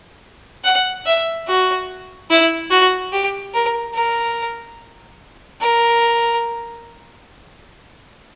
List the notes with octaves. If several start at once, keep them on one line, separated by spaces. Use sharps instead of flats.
F#5
E5
F#4
E4
F#4
G4
A#4
A#4
A#4